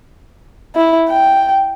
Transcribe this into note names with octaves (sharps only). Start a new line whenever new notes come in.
E4
G5